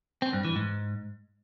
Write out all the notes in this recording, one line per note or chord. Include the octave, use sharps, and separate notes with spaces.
C4
G2
E3
G#2